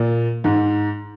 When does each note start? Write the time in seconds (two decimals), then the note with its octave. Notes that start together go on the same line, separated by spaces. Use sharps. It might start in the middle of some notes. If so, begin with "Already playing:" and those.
Already playing: A#2
0.44 G#2